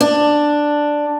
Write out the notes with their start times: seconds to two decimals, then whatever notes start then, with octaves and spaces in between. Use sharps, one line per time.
0.01 D4